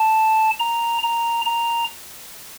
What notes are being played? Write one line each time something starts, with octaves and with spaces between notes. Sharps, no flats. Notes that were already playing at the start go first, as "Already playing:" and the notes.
Already playing: A5
A#5
A#5
A#5